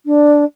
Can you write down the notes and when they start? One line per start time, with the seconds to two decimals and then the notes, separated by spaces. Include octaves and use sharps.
0.06 D4